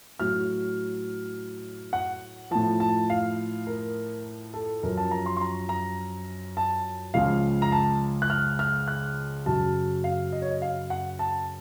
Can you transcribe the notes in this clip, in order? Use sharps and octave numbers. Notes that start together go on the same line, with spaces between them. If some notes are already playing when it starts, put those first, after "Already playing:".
A2 F#3 F6
F#5
A2 F3 A5
A5
F5
A#4
A4
F#2 F3 A#4
A5
A#5
C6
C6
A#5
A#5
A5
C#2 C#3 F3 F5
A#5
A5
F#6
F6
F6
F#6
F#2 C#3 F#3 A5
F5
D#5
C#5
D#5
F5
F#5
A5